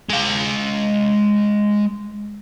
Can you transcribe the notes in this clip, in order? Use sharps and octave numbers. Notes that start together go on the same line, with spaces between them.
G#3 F5